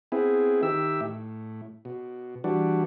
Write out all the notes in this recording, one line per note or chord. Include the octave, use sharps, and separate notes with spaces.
B3 C4 E4 G#4
D#3 G4 E5 E6
A2
B2
E3 G3 D4 F#4